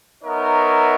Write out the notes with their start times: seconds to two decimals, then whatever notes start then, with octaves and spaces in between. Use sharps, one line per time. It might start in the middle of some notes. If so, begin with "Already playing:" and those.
0.23 B3 D#4 A#4 C#5 E5